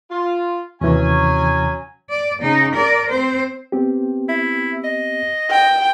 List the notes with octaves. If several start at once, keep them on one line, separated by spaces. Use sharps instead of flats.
F4
D#2 C3 E3 F#3 C#4 G#5
D5
C#3 D#4
A#4 D5
C4 C5
B3 C4 G4
E4
D#5
G5